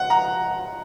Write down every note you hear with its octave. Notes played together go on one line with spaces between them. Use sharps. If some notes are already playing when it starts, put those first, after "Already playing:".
Already playing: F#5
A#5